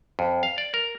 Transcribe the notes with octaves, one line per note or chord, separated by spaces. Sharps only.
F2
F5
D5
A#4